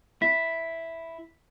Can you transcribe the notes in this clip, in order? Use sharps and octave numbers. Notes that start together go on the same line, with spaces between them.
E4 B6